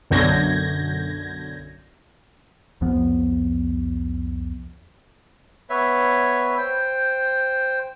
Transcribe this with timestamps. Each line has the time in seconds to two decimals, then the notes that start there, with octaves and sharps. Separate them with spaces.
0.11 B1 F#2 D3 G6 G#6 A#6
2.81 C2 F2 F3 B3
5.70 B3 B4 C#5 E5
6.58 C5 G5